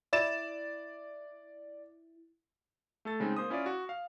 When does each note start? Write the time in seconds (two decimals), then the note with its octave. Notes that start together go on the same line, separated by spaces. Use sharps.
0.13 E4 D5 A6 E7
3.05 A3 A4 A6
3.20 C#3 G#3 C4 D#4
3.37 A#3 C5 D#6
3.50 C#4 E4 F4 D5
3.66 F#4
3.89 F5